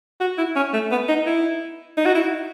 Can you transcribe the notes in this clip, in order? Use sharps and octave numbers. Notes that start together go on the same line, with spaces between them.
F#4
E4
C#4
A3
B3
D#4
E4
D#4
F#4
E4